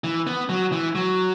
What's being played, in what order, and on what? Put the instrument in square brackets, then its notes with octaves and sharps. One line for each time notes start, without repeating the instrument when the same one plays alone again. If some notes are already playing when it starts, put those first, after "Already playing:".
[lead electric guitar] E3
B3
F#3
E3
F#3